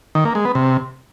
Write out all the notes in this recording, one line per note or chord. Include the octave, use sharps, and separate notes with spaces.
D#3
A#3
G#3
B3
C3